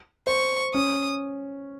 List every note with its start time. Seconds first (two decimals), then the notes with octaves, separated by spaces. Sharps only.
0.27 C5 C#6
0.74 C#4 D#6